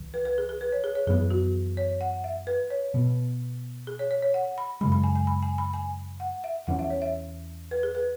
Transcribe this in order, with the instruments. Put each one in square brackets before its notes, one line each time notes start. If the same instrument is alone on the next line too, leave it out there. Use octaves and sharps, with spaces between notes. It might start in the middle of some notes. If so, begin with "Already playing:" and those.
Already playing: [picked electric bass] C#2 E3
[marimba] B4
B4
G#4
G#4
B4
C#5
G#4
C#5
[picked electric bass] F#2 E3 B3 [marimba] G#4
[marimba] F#4
C#5
F#5
E5
B4
C#5
[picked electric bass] B2 B3
[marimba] G#4
C#5
C#5
C#5
F#5
B5
[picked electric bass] F#2 C#3 G#3 [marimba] B5
[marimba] B5
G#5
G#5
B5
G#5
B5
G#5
F#5
E5
[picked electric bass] E2 E3 C#4 [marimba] F#5
[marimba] E5
C#5
E5
B4
G#4
B4